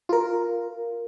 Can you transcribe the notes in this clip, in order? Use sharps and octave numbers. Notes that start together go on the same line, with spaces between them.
F4 A#4